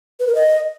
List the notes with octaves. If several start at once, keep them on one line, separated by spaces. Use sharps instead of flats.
B4
A#4
D#5